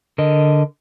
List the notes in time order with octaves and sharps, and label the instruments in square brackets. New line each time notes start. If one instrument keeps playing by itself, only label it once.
[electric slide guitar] D3 A#4 D#5